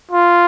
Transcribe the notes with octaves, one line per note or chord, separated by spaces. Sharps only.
F4